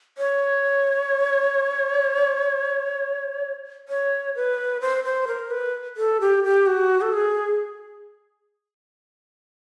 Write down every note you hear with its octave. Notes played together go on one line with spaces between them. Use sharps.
C#5
C#5
B4
C5
C5
A#4
B4
A4
G4
G4
F#4
A4
G#4